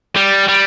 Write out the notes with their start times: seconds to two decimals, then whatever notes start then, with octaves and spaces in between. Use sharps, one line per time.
0.16 G3
0.48 G3